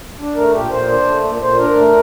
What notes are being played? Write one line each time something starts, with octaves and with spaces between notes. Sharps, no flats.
D4
A3 A#4
A#2 G4
A#2 C5
D4
A3
A#2
A#2 C5
D4 A#4
A3